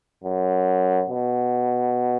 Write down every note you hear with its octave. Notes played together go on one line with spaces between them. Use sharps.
F#2
B2